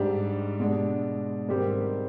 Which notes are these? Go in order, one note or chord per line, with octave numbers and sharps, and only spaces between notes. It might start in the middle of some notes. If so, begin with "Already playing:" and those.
Already playing: G#2 G3 D4 G4
B2 G#3 D4
G#2 D#3 G3 C4 G4